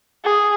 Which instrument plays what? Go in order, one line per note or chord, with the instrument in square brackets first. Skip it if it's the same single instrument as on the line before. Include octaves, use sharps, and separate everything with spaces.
[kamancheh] G#4